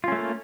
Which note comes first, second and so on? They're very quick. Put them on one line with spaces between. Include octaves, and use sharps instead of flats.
F4 C#4 A3 A#3